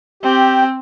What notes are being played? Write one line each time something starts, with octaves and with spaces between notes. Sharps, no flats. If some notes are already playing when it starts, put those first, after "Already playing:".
C4 G4